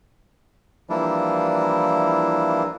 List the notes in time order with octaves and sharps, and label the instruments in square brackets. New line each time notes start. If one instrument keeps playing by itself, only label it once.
[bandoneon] E3 F3 G3 A#3 D4 E4